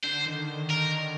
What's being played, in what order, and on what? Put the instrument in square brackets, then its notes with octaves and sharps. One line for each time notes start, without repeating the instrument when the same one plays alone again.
[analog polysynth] D3 [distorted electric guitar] C5
[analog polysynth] D#3
D3
[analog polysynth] D3 [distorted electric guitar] A#4